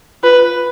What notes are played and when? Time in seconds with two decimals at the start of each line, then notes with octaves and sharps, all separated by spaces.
0.23 F4 B4
0.42 F4